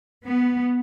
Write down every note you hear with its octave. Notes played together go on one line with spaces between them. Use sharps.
B3